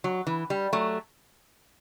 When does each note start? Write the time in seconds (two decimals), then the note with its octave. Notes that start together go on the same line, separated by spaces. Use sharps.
0.04 F#3
0.27 E3
0.50 G3
0.73 F#3 A3